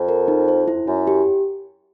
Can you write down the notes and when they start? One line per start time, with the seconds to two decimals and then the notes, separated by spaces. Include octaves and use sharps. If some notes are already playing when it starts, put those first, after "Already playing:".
Already playing: F2
0.08 A#4
0.28 D#4
0.48 C5
0.68 E4
0.87 F#2 E4
1.07 G4